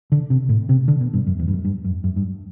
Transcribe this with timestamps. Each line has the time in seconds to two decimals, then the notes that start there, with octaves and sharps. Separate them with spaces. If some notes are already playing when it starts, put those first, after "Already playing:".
0.12 D3
0.30 C3
0.49 A2
0.69 C3
0.88 D3
1.01 B2
1.13 G2
1.27 F#2
1.39 E2
1.48 G2
1.53 F#2
1.65 G2
1.84 F#2
2.04 F#2
2.16 G2